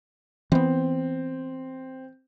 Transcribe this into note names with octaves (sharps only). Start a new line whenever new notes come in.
E3 B3 C4